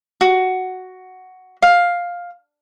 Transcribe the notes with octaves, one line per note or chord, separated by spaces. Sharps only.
F#4
F5